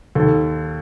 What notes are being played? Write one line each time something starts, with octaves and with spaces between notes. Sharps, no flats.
D#2 A4